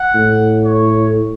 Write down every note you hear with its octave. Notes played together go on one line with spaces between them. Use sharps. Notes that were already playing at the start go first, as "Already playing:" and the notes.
Already playing: F#5
A2
C#5